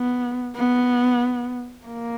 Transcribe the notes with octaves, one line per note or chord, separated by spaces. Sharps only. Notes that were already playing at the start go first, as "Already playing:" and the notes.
Already playing: B3
B3
A#3